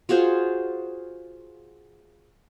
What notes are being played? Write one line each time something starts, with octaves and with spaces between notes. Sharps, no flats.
F4 F#4 G#4 C5